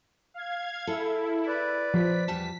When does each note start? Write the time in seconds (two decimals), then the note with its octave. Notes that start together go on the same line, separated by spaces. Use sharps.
0.34 F5 G#6
0.87 E4 G#4 A4
1.47 B4 D5
1.94 F3 B6
2.28 E2 G3 A5